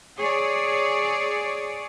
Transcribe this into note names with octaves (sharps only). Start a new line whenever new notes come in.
G#4 C#5 D5